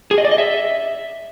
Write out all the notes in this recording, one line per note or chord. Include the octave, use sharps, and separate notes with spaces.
G#4
D#5
D5
D#5
E5